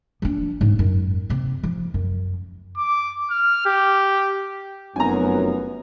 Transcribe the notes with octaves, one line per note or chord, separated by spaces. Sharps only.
F3 D4
G#2
F#2
C3 C4
F3
F#2
D6
F6
G4
F1 F#2 B3 G#5 A#5